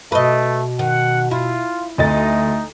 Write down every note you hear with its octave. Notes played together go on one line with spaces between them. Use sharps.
B2 A3 B4 D#5
D#3 F#5
E4 F4
D2 A3 D#4 D#5 A6